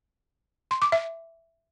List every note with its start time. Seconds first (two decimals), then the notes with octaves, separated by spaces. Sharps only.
0.71 C6
0.82 D6
0.92 E5